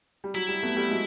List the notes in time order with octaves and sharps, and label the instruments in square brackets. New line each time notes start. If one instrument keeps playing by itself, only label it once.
[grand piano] G3
[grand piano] F#3 [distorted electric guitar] E4
[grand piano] G3
A3 B3
G3 A3
F#3 G#3